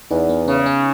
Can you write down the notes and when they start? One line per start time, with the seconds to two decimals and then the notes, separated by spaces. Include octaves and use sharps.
0.11 E2 D#4
0.29 B3
0.47 C#3 C#4
0.66 C#4